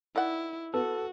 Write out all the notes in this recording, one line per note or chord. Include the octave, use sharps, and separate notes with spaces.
D#3 E4 D5 F#5
B3 F#4 A4